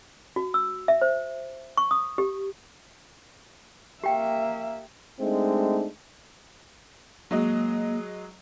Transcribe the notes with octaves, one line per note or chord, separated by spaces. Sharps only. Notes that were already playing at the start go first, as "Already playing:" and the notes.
F#4
E6
E5
C5
C#6
D#6
G4
A#3 G4 E5 G5
G#3 A3 C4 D4 D#4
F#3 G#3 A#3 D#5